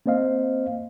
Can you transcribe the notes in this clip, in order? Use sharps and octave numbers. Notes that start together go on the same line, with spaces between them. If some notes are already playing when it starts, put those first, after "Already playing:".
A#3 C4 C5 D#5 F5